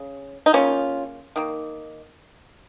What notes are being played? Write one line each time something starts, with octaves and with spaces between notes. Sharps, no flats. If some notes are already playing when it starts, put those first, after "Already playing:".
Already playing: C#3
D#4
C#3 A#3 C#4 F4
D#3 A#3